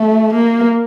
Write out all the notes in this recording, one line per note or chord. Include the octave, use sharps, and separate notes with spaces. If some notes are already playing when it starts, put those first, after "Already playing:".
Already playing: A3
A#3